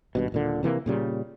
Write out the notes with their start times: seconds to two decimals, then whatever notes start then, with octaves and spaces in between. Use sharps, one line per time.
0.15 G#1 G2 B2
0.32 D#1 A#2 D3
0.63 C3 E3 G#3 A#3
0.86 A#2 C#3 G3